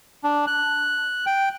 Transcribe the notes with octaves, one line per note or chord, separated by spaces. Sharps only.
D4
F#6
G5